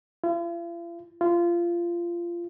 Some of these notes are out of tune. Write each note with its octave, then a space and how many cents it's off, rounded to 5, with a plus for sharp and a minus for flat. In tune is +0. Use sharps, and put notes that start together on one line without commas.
F4 -45
F4 -20